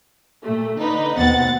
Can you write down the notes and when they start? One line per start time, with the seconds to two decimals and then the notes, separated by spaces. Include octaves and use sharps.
0.43 A#2 A3
0.78 D3 D#4 B4
1.17 D#2 B2 B3 C4 F#5 A6